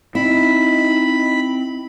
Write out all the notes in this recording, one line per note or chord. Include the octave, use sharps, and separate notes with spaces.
C4 D#4 E4 B5